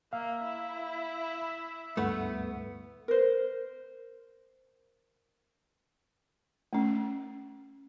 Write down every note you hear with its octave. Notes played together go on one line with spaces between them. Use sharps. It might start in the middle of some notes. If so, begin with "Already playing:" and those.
A#3 E5 F5
E4
D2 G2 A3 B3 B4 F#5
A#4 C5
A3 C#4